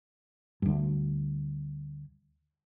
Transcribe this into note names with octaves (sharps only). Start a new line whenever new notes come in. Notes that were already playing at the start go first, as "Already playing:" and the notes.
D2 G2